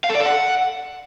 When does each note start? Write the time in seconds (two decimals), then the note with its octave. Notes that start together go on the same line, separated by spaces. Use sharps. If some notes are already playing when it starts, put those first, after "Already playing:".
0.04 F5
0.09 A4
0.15 D5
0.20 A4
0.26 F#5